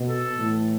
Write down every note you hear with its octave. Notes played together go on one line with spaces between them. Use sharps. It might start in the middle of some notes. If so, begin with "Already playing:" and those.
Already playing: B2
A4
A2 E3